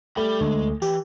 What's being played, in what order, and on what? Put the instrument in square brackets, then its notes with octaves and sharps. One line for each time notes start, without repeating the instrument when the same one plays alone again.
[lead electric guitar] G3 B5 [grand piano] A3
[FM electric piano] D2 [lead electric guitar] G#3
[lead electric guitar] E3 [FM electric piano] G4